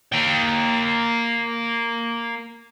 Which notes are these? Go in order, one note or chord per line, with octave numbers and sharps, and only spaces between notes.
A#3 G5